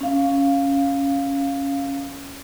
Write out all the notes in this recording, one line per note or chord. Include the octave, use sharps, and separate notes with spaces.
C#4 F5